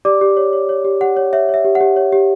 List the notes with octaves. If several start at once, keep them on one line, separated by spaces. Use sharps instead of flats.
G4 D5 D6
G4
C#5
C#5
C#5
G4
G4 F#5
C#5
C#5 E5
C#5 E5
G4
F#5
G4
C#5
G4